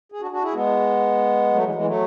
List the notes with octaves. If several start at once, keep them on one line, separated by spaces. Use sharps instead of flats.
G#4
D4 F#4
D4 F#4
E4 G#4
G#3 B3
F#3 A3
E3 G#3
E3 G#3
F#3 A3